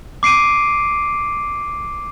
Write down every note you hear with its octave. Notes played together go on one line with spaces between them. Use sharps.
D6 C7 D7 D#7